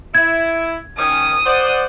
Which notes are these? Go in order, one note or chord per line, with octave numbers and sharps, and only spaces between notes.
E4 G#6
D#3 C#4 D#6
C5 D5 F#5